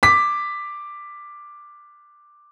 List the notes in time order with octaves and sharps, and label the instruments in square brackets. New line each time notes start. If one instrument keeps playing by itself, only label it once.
[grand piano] D6 B6